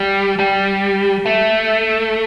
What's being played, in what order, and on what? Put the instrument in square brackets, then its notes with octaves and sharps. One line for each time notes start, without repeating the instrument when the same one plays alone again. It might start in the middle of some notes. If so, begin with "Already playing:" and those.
Already playing: [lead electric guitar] G3
G3
A3